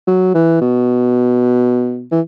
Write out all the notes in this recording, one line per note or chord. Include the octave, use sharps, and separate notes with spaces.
F#3
E3
B2
E3